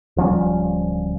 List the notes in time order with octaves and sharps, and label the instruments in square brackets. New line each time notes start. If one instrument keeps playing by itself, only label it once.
[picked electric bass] D1 F3 G3 C#4